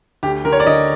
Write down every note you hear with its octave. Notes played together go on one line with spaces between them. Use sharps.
D2 G4
D3 A#4
C#5
D5
D3 D#5